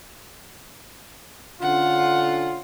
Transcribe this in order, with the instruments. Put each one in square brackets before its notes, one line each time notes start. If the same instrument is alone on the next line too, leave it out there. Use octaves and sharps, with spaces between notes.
[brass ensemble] D3 C#4 F4 [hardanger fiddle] F#5